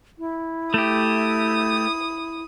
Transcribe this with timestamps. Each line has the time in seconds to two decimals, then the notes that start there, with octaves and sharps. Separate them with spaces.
0.19 E4
0.74 A3 G4 D#6